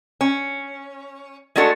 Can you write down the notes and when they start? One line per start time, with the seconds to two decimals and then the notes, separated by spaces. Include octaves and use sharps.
0.21 C#4
1.56 G#3 A3 D4 F#4 A4